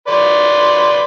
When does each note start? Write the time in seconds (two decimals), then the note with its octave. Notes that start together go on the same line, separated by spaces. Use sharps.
0.08 B4 D5 C6